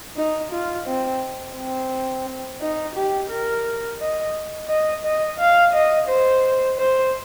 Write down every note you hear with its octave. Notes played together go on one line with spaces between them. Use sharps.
D#4
F4
C4
C4
D#4
G4
A#4
D#5
D#5
D#5
F5
D#5
C5
C5